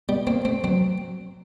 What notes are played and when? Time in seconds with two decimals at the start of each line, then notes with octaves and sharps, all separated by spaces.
0.09 G3 B3
0.27 A#3 C4
0.45 A3 C4
0.64 F#3 C4